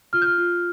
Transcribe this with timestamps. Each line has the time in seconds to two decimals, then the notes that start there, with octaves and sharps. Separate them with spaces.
0.13 F4 F6
0.22 G6
0.27 F6
0.38 F4